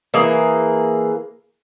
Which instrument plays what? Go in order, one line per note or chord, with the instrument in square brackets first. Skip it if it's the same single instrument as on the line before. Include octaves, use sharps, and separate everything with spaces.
[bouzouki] E3 A#3 G#4